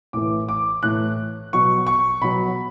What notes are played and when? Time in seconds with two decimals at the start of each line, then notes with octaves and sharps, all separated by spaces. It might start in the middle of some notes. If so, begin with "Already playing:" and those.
0.13 A2 E3 D6
0.49 D6
0.83 A2 E3 F#6
1.53 B2 F#3 C#6
1.87 C#6
2.21 B2 F#3 B5